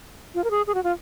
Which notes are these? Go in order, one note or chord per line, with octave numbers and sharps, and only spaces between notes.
F4
A#4
G#4
G#4
F#4
F4